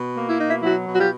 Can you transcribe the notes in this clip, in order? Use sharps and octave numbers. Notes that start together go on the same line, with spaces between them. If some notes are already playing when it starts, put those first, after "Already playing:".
Already playing: B2
A#3
E4
B2 D#4
E4
F#3 E4 F#4
B2
F#4
F4 G4